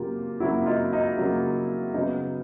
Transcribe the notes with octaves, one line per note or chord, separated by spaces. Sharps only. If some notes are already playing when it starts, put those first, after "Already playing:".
Already playing: C#3 F#3 A#3 F4 G4
C#3 F#3 A#3 E4 F#4
D#4 F4
D#4
C#3 F#3 A#3
C#3 F#3 B3 D#4